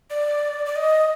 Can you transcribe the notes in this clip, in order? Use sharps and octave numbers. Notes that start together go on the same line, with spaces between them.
D5
D5
D#5